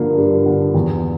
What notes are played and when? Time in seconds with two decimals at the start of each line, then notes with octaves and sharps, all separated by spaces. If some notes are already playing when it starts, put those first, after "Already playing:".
Already playing: G2 D3 F3 A#3
0.17 G2
0.46 D3
0.75 E2